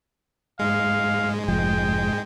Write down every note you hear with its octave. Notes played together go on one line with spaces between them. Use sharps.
G#2 G#3 F5
F1 F3 G5